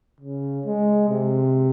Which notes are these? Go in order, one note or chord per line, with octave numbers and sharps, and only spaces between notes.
C#3
G#3
C3